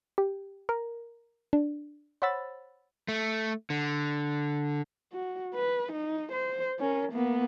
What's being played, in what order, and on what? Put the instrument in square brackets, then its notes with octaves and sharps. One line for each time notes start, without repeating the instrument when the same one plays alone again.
[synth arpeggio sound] G4
A#4
D4
C5 C#5 F#5 B5 E6 A6
[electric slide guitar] A3
D3
[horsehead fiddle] F#4
B4
D#4
C5
C#4 A#4
A#3 B3